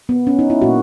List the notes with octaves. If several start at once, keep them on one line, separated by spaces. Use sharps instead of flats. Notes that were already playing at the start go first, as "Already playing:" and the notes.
B3
C#4
D#4
E4
A#2 A#3 F#4